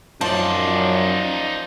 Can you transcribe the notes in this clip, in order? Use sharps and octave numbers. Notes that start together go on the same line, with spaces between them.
F#2 F3 D#4 D5 A5